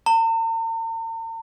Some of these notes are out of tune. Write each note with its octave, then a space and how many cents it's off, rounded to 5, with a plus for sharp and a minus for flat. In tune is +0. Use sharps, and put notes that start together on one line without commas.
A#5 -45